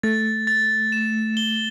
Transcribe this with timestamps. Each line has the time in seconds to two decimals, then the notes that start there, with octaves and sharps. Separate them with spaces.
0.03 A3 A6
0.47 A6
0.92 E7
1.37 G7